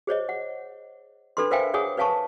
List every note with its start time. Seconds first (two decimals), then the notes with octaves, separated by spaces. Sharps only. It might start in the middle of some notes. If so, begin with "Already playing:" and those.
0.07 G#4 C5 C#5 D#5
0.29 F#5
1.37 D4 A4 B4 B5 C6
1.51 A#4 C5 E5 F5 G5 G#5
1.74 G#4 C#5 F#5 G#5 D#6
1.97 B4 C#5 F5 G#5 A5 C#6